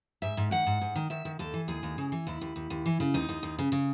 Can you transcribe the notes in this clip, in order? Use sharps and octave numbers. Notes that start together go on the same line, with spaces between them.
G#2 E5
G#2
D#3 F#5
G#2
G#2
D#3
D#3 E5
D#3
D#2 A4
E3
D#2 G#4
D#2
C#3
E3
D#2 E4
D#2
D#2
D#2
E3
C#3
D#2 D#4
D#2
D#2
C#3
C#3